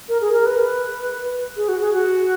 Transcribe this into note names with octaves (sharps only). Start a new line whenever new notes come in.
A#4
G#4
A#4
B4
G#4
F#4
G#4
F#4